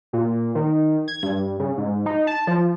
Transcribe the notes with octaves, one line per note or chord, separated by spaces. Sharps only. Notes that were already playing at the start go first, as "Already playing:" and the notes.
A#2
D#3
G#6
G2
C#3
G#2
D#4
A5
F3